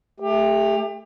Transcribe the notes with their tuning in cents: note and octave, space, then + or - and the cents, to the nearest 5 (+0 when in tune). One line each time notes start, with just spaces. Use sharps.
A3 +0 G4 +30